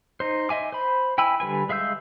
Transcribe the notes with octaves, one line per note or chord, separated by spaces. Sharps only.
D#4 C5
D#5 E5 G#5 D6
C5 B5
E4 G5 G#5 B5 E6
D3 G3 B4 G#5
G#3 E5 F5 E6 G6